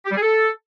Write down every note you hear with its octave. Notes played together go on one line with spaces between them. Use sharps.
G4
G3
G#4
A4